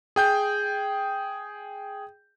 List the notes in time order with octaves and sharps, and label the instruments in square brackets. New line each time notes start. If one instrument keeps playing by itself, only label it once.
[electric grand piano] G#4 G5 G6